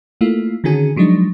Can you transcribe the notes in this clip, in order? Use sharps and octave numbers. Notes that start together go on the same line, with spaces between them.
A3 A#3 E4 F4
D3 D#3 C#4 F#4 G#4
F3 F#3 G#3 D4 D#4